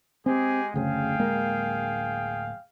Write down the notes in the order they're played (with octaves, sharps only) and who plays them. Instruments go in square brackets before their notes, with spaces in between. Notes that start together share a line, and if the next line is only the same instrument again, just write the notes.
[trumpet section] G#3 G4 G#4 [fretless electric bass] C4
[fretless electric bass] F#1 D2 C#3 [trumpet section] G#4 F5 G5
[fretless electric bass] D1 G#3 A#3